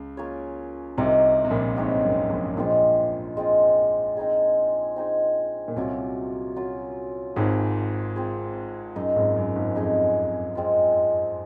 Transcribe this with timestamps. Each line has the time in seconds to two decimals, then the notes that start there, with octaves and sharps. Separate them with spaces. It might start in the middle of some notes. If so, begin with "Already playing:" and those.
Already playing: C#2
0.17 A#3 F4 G#4 C#5
0.97 C2 C3 C4 D#4 A#4 C#5
1.45 C3
1.51 A#1 A#2
1.77 G#1 G#2 C4 D#4 A#4 C#5
2.04 F#2
2.30 A#1 A#2
2.57 A#1 A#2 G#3 C4 F4
3.37 G#3 C4 F4
4.17 C4 D#4 G#4
4.96 C4 D#4 G#4
5.68 A#2
5.76 C2 C3 F#3 A#3 C#4 F4
6.56 F#3 A#3 C#4 F4
7.36 G#1 G#2 C4 F4 G#4 C5
8.16 C4 F4 G#4 C5
8.96 F#2 D#4 G#4 D#5
9.16 G#1 G#2
9.36 F#2
9.56 G#1 G#2
9.75 F2 D#4 G#4 D#5
10.55 G#3 C4 F4